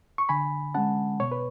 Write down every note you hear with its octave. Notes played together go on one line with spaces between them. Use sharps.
C#6
D3 G#5 B5
G#3 C#4 F#5 A5
B2 C#5
B4